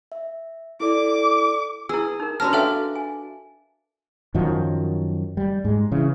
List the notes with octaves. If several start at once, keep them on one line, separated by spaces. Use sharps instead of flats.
E5
E4 A4 D5 D6
E4 G#4 B4 E6
D#4 A#4
C#4 D4 F#4 B4 A5 A#5 F6
F#4 A4 D5 E5 F5 G5 F6
G#5
F#2 D#3 F3 F#3
G3
G#2 G#3
C#3 E3